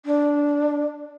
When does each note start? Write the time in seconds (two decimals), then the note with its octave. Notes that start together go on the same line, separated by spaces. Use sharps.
0.05 D4